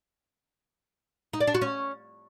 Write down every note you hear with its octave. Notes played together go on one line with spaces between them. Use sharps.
D#4
D5
D4
F#4
C#4